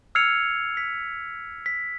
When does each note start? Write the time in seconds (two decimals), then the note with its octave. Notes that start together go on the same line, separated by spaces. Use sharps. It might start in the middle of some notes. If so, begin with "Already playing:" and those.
0.15 E6 F6 G#6 C7 C#7 F7
0.77 B6
1.66 B6